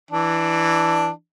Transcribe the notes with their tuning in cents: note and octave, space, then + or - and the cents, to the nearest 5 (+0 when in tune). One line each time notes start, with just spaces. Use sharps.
E3 +0 D4 +5